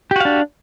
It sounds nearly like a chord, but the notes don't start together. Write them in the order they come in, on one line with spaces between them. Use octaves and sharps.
G4 F#4 F5 D4